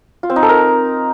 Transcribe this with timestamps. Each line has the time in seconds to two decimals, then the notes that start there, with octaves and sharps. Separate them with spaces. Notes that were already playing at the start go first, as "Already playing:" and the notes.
0.23 F4
0.30 C4
0.36 D#4
0.43 A4
0.49 A#4